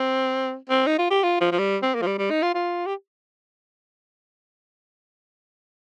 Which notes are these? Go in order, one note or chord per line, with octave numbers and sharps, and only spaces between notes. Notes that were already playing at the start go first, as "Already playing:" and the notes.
Already playing: C4
C4
D#4
F4
G4
F4
F3
F3
G3
C4
A#3
F3
G3
G3
D#4
F4
F4
G4